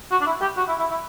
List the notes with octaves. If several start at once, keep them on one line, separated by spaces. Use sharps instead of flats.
F#4
D4
E4
G4
F#4
E4
E4
E4